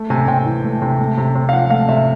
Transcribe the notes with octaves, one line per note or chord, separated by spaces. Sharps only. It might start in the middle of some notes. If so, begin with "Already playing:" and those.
Already playing: A3
C3 G#5
C3 G5
E3
A3
C3
A3
C3
C3
F5
F3 F#5
A3 F5
C3 E5